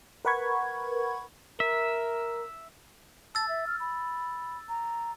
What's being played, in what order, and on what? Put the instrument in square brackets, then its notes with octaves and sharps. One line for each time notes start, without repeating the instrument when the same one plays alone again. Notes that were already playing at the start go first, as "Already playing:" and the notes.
[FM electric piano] A#4 B4 F#5 B5 C#6 G#6
[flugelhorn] A#4 [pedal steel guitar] E5
[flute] A5 [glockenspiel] E6 A6
[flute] E5
F6
B5
A#5